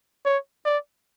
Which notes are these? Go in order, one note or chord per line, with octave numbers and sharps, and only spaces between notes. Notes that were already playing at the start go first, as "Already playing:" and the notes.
C#5
D5